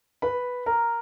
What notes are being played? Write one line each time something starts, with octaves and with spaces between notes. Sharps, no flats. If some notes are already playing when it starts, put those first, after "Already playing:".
B4 B5
A#4 A#5